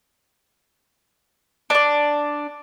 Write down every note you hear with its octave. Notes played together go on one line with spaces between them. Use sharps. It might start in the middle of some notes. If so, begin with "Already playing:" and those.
D4 D5